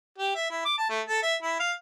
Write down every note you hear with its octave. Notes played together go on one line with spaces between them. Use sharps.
G4
E5
E4
D6
A5
A3
A4
E5
E4
F5